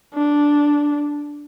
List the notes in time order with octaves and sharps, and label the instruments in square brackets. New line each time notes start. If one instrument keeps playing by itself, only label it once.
[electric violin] D4